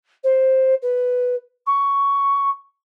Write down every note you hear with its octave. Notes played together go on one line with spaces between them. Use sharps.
C5
B4
C#6